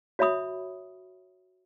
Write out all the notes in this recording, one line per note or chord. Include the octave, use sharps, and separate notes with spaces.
F#4 C#5 E5 B5 D#6